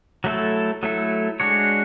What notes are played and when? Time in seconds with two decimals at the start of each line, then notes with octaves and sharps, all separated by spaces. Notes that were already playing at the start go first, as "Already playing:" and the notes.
0.24 F#3 A3 E4 A4
0.83 F#3 A3 E4 A4
1.40 G#3 D4 F#4 C#5